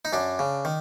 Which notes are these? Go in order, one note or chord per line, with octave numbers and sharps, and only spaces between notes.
D#4
F#2 D4
C#3
D#3